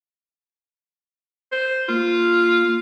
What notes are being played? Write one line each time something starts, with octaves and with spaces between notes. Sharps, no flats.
C5
A#3 F4